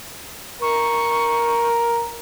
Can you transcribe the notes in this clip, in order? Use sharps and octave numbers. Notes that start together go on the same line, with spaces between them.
A#4 C#6